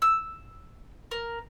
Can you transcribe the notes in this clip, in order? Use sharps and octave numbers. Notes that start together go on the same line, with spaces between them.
E6
A#4